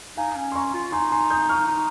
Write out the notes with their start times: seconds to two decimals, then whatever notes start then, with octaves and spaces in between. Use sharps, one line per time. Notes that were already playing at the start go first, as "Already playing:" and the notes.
0.17 D#4 F5 G#5
0.36 C#4
0.52 C6
0.55 C#4 A#5 C#6
0.74 F4
0.92 D#4 G#5 C6
1.12 G#5 C6
1.30 D#6 G6
1.49 C#6 F6
1.68 D#4